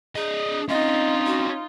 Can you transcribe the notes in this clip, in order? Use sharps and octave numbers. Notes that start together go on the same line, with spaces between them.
D4 G#4 D#5
C4 C#4 D#4 F4 D#5
F#4